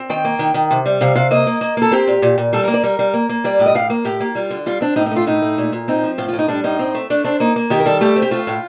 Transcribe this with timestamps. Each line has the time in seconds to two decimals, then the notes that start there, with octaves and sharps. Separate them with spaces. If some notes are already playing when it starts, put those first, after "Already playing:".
Already playing: C4
0.10 D#3 G5
0.25 A#3
0.39 D#3
0.54 D#3
0.71 C3
0.86 G3
1.01 C3 F5
1.15 C3 F5
1.31 A#3 D#5
1.47 A#3
1.61 A#3
1.77 A#3 A4
1.91 C4 G4
2.07 A#2
2.22 A#2
2.38 A#2
2.53 G3 A4
2.64 A#4
2.68 A#3
2.74 D5
2.83 G3 A#4
2.99 G3
3.14 A#3
3.29 A#3
3.44 G3 D5
3.59 A2
3.66 D#5
3.74 A2 F5
3.90 A#3
4.05 A2 G4
4.20 A#3
4.35 G3 F4
4.50 D3
4.66 G3 F4
4.81 C4 D4
4.96 A2 D#4
5.06 D#4
5.11 A3 F4
5.27 A2 D#4
5.42 A3
5.58 A#2
5.72 A#2
5.88 C4 D#4
6.03 F3
6.18 A2 F4
6.28 F4
6.33 A2
6.39 D#4
6.48 G3 D4
6.64 A2 D#4
6.79 C4
6.95 A3
7.10 A3 D4
7.24 C4 D4
7.40 A#3 D#4
7.56 A#3
7.70 D#3 G4
7.80 A#4
7.85 G3 A4
8.01 A3 G4
8.16 C4
8.22 G4
8.31 A3 F4
8.47 A2